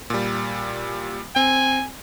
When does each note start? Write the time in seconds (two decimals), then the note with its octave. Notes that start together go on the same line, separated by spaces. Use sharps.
0.10 A#2 G3
1.36 C4 G#5